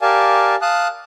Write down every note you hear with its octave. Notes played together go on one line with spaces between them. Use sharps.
G4 A#4 D5 F5 G#5 A5
F5 A5 D#6 F#6